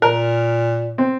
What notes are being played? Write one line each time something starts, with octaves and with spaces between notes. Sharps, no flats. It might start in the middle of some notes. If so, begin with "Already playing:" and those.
A#2 A#4
C4